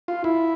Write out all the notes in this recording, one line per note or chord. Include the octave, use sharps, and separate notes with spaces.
F4
E4